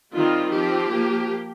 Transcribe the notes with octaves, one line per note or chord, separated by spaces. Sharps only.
D#3 G3 C4 F4
F3 C4 G4
F3 A#3